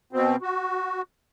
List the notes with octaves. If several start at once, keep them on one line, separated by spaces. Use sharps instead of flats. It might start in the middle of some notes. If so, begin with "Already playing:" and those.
B2 C4
F#4